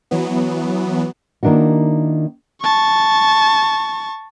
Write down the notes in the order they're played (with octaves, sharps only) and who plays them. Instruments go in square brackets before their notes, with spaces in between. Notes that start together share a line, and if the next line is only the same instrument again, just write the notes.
[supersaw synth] E3 F#3 B3
[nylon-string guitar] D#3 A#3 D4 E4 F#4
[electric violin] A5 C#6